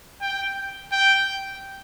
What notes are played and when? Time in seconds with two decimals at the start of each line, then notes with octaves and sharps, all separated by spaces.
0.21 G5
0.92 G5